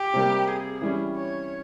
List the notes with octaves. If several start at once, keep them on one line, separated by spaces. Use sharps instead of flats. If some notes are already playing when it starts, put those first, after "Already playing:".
Already playing: G4
C3 G3 A#3
G#4
E3 G3 C#4
C#5